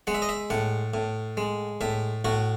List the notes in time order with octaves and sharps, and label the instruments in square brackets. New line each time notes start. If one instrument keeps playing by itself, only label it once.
[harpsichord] G#3 F#5
E5
D#5
E5
A2 F#5
A2
G#3
A2 E5
A2 F#4